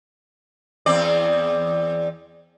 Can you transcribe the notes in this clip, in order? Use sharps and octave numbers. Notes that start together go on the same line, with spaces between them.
E2 C4 D5